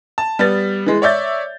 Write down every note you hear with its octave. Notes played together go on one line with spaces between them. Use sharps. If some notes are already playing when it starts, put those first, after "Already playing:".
A5
G3 B3 A6
E3 G#3
C#5 D5 E5 G6 A6